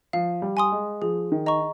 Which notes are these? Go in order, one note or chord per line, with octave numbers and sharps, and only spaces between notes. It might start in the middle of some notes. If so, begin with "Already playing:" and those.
F3 F5
G3
G#5 C6 D#6
G#3
F3 G#4
D#3
D#5 A#5 C#6